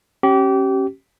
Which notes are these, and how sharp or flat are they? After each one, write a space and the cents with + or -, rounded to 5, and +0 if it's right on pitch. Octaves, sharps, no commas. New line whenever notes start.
C#4 -25 G4 -30